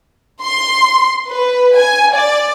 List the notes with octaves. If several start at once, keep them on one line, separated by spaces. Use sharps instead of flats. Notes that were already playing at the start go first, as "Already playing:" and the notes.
C6
B4
G#5
D5